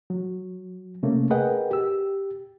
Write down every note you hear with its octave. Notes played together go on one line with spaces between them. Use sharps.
F#3
C3 A3 A#3 C#4
G#4 A#4 B4 D#5 F#5 G5
G4 E6